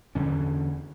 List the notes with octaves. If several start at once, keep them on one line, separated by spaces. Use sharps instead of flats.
E2 D3 C#4